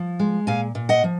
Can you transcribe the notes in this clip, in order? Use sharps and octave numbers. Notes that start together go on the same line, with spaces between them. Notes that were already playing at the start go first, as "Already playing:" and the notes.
Already playing: F3
G#3
A#2 F5 G#5
A#2
D#5 F#5
F3